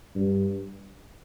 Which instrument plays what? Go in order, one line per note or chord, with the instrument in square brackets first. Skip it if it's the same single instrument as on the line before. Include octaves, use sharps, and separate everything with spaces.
[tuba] G2